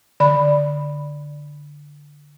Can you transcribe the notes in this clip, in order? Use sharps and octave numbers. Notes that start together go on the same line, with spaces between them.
D3 D5 B5